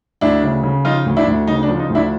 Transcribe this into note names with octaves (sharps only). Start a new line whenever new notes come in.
D2 D4 E4
C#3
C#3
F3 D#4 F4
D2
D4 E4
D2
C#3 D#4
D4
F3
D#4
D2
D4 E4